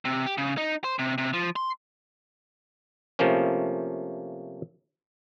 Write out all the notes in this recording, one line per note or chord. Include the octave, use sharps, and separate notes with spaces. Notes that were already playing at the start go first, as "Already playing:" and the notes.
C3
G4
C#3
D#4
C5
C3
C3
F3
C6
C3 F3 A3 A#3 C#4